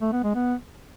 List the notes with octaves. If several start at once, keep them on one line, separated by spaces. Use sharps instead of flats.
A3
B3
G#3
B3